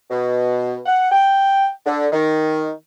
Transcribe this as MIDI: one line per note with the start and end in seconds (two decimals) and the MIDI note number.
0.10 0.79 47
0.86 1.11 78
1.12 1.68 79
1.86 2.07 50
2.12 2.70 51